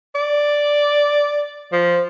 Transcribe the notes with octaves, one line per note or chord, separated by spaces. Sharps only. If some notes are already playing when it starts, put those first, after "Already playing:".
D5
F3